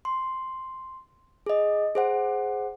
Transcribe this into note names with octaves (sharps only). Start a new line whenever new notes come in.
C6
G#4 D#5
G#4 C5 F#5